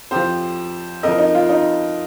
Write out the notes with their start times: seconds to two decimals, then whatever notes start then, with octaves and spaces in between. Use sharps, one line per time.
0.11 F2 F3 G4 C5
1.03 F2 F3 A#4 D#5
1.18 D#4
1.35 F4
1.50 D#4